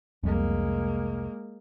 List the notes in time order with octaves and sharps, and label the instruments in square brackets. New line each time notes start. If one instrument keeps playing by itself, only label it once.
[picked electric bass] F1 C2 [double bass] G#3 A#3